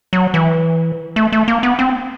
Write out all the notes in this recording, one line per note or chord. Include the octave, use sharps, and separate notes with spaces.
F#3
E3
A3
A3
A#3
B3
C4